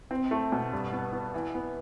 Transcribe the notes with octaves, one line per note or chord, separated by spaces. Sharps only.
C4
A3
B2
G2
B3
B3
E3
B3